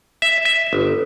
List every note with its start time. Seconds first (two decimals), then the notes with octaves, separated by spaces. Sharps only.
0.22 E5
0.45 E5
0.73 G1